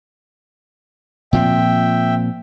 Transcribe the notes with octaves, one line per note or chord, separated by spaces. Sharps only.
A#2 F3 C4 E5 G5